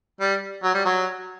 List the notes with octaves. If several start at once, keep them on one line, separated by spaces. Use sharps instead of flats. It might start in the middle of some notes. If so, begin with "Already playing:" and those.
G3
F#3
G3
F#3